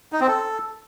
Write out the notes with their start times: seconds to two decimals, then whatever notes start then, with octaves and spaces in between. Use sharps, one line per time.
0.12 D#4
0.20 C4
0.28 A4